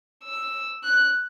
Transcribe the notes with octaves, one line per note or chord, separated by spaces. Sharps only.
E6
F#6